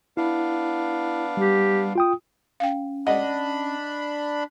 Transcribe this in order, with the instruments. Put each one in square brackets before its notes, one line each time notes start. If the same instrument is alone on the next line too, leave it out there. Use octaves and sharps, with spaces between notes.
[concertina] B3 D4 F5 [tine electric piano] E4
[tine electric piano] G3 [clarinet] G4
[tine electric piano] F4 G5 D#6
[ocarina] C#4 [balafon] F5 G5
[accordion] D4 B5 [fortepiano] D#5 [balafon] F#5